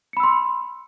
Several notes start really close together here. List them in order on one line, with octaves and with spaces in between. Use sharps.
C#7 B5 E6 C6